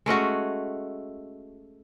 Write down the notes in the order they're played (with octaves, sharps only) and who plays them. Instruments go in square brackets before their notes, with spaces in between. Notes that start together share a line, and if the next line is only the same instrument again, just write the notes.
[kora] G#3 A3 C#4 F#4